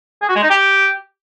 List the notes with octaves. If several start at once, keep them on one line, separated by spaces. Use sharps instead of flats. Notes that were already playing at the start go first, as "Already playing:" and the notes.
G#4
F#4
G#3
D#4
G4